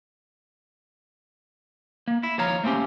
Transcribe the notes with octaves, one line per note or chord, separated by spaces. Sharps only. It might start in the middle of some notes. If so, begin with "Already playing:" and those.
A#3
E4
D#2 F3 C#5 F5 A#5
A3 A#3 C4 C#4 G4